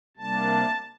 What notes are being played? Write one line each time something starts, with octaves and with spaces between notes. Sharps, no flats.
C3 G3 A#3 D4 A5